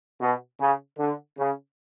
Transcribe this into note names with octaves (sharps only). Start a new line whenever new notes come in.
B2
C#3
D3
C#3